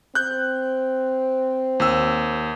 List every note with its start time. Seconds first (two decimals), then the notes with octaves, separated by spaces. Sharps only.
0.15 C4 F#6 G6
1.80 D#2 E6